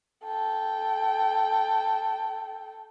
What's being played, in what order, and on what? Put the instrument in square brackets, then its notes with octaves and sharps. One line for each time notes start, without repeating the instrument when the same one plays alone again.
[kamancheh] A4 G5